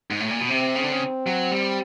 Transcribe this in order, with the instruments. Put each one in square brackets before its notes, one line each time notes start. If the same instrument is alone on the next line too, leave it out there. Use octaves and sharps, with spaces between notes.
[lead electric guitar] G#2
A2
A#2
B2
[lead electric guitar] C3 [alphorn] C4
[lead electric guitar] C#3
D3
C#3
F#3
G3